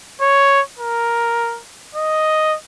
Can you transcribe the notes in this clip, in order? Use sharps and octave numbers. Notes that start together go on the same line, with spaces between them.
C#5
A#4
D#5